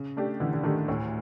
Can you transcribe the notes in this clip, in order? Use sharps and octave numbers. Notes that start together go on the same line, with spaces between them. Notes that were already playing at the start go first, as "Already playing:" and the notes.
Already playing: C#3
A3 D4 G4
D3 E3
D3
D#3 A3 D4 G4
D2 A2